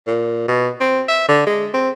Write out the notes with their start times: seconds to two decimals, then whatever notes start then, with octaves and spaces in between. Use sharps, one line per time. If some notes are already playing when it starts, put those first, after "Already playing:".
0.07 A#2
0.48 B2
0.80 C4
1.08 E5
1.29 D3
1.47 G#3
1.74 C4